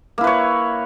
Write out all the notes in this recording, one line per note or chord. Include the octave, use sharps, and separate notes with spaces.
A#3 E4 B4 C#5